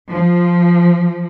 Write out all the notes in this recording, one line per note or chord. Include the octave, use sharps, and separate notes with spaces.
F3